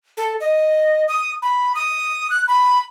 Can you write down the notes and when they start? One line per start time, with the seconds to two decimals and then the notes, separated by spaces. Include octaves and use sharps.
0.17 A4
0.40 D#5
1.08 D#6
1.42 B5
1.75 D#6
2.30 F#6
2.48 B5